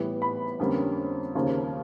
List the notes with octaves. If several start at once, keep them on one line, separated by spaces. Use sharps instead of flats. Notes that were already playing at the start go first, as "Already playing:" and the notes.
Already playing: A2 E3 G3 B3
B5
F2 D3 G3 A#3 C#4
D#2 C#3 F3 A#3